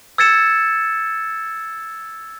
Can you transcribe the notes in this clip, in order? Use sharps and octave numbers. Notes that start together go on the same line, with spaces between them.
E6 G#6 A6 C#7 E7